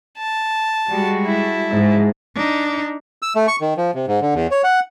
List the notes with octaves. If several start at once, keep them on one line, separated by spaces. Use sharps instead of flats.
A5
G3 G#3 F#4
E4 A5
G#2
D4 D#4
E6
A3
C#6
D#3
F3
C3
G#2
D3
E2
C#5
F#5